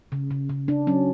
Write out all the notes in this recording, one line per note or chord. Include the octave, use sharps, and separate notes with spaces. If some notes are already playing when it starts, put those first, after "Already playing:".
C#3
C#3
C#3
C#3 D4
F#3 C#4